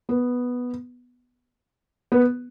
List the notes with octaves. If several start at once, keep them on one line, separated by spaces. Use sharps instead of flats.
B3
B3